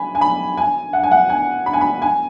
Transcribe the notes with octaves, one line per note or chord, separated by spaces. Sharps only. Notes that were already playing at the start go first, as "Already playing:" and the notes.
Already playing: G#5 B5
G#5
B5
G#5
F#5
G#5
F#5
G#5
B5
G#5
B5
G#5